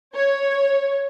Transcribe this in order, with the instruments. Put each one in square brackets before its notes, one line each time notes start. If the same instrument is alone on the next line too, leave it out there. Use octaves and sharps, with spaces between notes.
[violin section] C#5